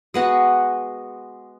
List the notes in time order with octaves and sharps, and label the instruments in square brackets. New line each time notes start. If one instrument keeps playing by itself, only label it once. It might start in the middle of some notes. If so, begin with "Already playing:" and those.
[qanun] G#3 B3 F#4